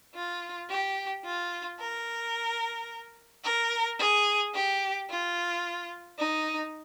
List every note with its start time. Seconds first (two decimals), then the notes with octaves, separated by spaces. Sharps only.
0.15 F4
0.69 G4
1.25 F4
1.80 A#4
3.44 A#4
3.99 G#4
4.54 G4
5.09 F4
6.18 D#4